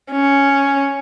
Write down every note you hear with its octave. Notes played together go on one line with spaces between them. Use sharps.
C#4